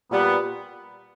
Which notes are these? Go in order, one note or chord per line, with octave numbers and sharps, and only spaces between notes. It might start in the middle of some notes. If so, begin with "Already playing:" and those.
A#2 G3 B3